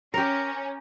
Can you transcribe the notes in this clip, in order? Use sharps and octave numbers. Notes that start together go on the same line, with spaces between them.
C#4 G4 A#4